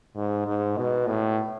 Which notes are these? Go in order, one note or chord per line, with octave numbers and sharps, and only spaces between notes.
G#2
G#2
B2
A2